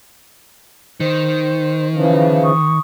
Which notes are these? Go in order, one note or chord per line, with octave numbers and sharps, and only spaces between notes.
D#3 C5
C#3 E3 F3
C#6 D#6